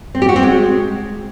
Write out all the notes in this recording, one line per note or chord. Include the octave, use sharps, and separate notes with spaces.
C4
G4
F#4
C4
G#3